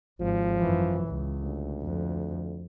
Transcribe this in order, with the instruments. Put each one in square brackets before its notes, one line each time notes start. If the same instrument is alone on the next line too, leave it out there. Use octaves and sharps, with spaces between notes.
[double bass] G#1 [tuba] F3
[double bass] F#2 E3
C#2
[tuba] D2
[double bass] F2